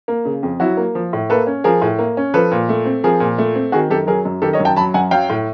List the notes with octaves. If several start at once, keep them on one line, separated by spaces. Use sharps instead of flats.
A#3
C#3
F2
F#3 E4 F#4
A#3
F3
A2
A#3 A4 B4
C#4
F3 G#4 A#4
A2
A#3
C#4
F3 A4 B4
A#2
A3
C4
F3 G#4 A#4
A#2
A3
C4
D#3 F#4 G#4
F#2 G4 A4
F#3 G#4 A#4
F#2
D#3 G4 A4
C#5 D#5
F#2
G5 A5
F#3 A5 B5
F#2 F#5 G#5
F#3 F5 G5
A2